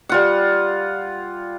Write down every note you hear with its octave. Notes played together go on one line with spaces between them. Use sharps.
G3 F4 F#5